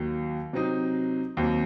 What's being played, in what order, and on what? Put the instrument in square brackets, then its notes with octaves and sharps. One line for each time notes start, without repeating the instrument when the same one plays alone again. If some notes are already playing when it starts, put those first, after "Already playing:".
Already playing: [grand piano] D#2 D#3 F#3
C3 F#3 C4 D#4
D#2 D#3 F#3 C4